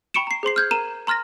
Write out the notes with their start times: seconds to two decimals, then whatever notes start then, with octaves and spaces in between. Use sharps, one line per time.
0.14 G5 B5 C#6 C#7 D7 E7
0.27 A#5 C7
0.43 G#4 C5 C6 C7
0.56 F6 G6 G#6
0.71 A#4 A#5 D#7 E7
1.07 A#5 C6 F6 A6 A#6